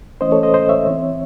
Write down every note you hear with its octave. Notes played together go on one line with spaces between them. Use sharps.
E3 A3 C#4 C5 D#5
A4 C#5
C5 D#5
C5 D#5
C#5 E5
E3 C4